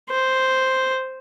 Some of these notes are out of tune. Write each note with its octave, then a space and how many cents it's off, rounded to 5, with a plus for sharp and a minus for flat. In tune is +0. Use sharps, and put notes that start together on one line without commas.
C5 +0